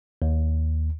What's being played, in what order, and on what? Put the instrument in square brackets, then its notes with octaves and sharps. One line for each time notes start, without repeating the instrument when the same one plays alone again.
[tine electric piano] D#2